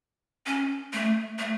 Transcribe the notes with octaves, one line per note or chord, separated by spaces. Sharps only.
C#4
A3
A3